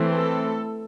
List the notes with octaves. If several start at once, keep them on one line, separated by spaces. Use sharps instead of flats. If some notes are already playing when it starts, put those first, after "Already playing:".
Already playing: E3 A3 C4
A4